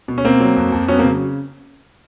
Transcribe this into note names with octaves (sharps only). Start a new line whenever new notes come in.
B2
C#4
B2 A#3 C4
F#3
F2
F2
F#3 B3 C#4
A#3 C4
C#3